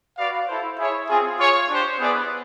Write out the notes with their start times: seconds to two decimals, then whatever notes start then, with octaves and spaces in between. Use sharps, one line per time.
0.18 F#4 B4 D5 F5
0.48 E4 A4 C5
0.79 E4 G#4 C#5 E5
1.09 C4 F4 G#4
1.39 F4 G#4 C#5
1.69 D4 G4 C5
1.99 B3 E4 G#4 B4 D5